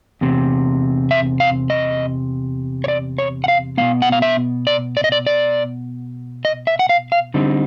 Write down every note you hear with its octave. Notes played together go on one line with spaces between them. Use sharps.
E2 C3
E5
F5
D#5
C#5
D5
C#5
F#5
F5
B2 G3 B3 F5
F#5
F5
E5
D5
D5
D#5
D5
D5
D#5
E5
F#5
F5
F5
D3 G3 C4 D#4